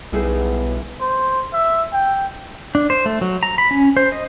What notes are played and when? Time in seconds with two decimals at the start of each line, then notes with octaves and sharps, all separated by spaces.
0.12 B1 G3 B3 D#4 E4 G#4 A4
1.01 C5
1.53 E5
1.93 G5
2.75 D4
2.90 C5
3.06 A3
3.21 F#3
3.43 A#5
3.58 B5
3.71 C#4
3.97 C5
4.12 D#5